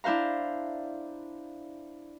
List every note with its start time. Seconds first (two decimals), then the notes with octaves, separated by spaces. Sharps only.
0.04 D4 E4 C5 F5 A#5